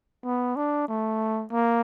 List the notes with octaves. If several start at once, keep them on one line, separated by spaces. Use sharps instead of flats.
B3
D4
A3
A#3